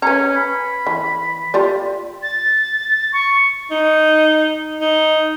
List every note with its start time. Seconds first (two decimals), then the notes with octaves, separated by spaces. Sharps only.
0.02 C#4 B4 A#5
0.36 B5
0.87 E3
1.54 F4 G4 D5
2.23 A6
3.13 C#6
3.71 D#4
4.81 D#4